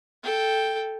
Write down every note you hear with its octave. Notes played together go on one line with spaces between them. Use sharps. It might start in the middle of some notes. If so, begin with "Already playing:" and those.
A4 G5